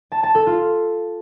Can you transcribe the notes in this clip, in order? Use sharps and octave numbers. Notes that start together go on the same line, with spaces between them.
A5
A5
A4
F4